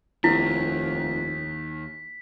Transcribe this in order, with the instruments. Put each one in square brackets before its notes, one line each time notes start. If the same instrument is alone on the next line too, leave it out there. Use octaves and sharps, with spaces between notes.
[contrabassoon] F1 [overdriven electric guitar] D#2 [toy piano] E4 [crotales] B6